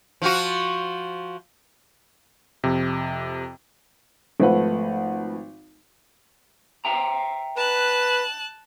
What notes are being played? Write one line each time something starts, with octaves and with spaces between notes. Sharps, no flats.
F3 F4 F#4
F2 C3
G#1 F3 A3 B4 F#5
E5 G5 A#5
B4 A5 F#6